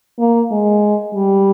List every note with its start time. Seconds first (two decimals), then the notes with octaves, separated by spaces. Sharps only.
0.19 A#3
0.51 G#3
1.14 G3